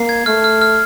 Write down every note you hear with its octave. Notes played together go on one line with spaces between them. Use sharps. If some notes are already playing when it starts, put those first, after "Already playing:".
Already playing: A#3 C7
G#6
A3 F6
F6
F6